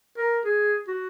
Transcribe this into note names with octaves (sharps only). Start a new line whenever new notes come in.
A#4
G#4
F#4